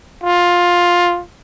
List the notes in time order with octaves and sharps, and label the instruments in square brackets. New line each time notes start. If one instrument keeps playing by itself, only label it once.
[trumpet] F4